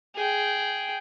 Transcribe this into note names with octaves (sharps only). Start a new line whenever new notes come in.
G#4 G5